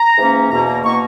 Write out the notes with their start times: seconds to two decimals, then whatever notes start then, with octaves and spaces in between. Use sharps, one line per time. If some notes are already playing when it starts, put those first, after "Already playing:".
Already playing: A#5
0.18 G#2 E3 A#3 C#4
0.51 E2 B2 A#3 A#5
0.67 A#5
0.84 B2 A#3 C#6